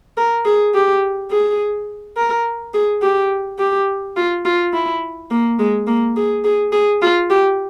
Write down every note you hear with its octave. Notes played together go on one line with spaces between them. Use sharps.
A#4
G#4
G4
G#4
A#4
G#4
G4
G4
F4
F4
E4
A#3
G#3
A#3
G#4
G#4
G#4
F4
G4